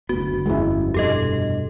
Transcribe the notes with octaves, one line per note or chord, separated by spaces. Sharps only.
F#1 D2 B3 F#4
G1 F2 G#3 C#4 E4
F1 G2 B2 G4 A4 D#5